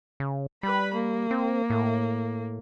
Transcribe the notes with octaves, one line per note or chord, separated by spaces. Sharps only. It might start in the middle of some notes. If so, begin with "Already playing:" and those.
C#3
G3 B4 B5
A#3
C4
A2